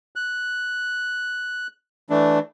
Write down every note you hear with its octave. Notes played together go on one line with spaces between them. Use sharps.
F#6
E3 A3 D4